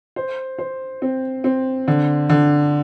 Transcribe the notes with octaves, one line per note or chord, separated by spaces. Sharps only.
C5
C5
C4
C4
D3
D3